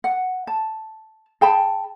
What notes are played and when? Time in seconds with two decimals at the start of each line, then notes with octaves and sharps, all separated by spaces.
0.04 F#5
0.47 A5
1.41 G#4 G5 A5 B5